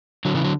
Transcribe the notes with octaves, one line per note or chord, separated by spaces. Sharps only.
D3 F#3
C#3 E3
D3 F#3